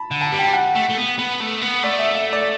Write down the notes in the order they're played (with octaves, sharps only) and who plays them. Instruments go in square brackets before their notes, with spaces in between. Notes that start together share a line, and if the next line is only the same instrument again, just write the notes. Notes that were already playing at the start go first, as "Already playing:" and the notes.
Already playing: [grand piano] A5 B5
[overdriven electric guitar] D3
[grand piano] A5
[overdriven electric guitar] G3
[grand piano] G5
F#5
[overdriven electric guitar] A3
A3
B3
B3
A3
B3
[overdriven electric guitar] A3 [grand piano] D5
[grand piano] E5
E5
D5